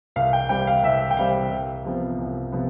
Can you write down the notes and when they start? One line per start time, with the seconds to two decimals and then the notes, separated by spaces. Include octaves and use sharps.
0.16 C2 F5
0.33 G5
0.49 C3 G3 C4 G5
0.67 F5
0.83 C2 E5
1.11 G5
1.17 C3 G3 C4 F5
1.51 C2
1.85 C3 F3 B3
2.18 C2
2.52 C3 F3 B3